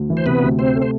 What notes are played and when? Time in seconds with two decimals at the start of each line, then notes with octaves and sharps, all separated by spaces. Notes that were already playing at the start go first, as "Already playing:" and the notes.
Already playing: D2
0.10 E3
0.17 C5
0.26 C3 B3 B4
0.42 D2
0.59 C3 C4 C5
0.75 A3
0.82 C5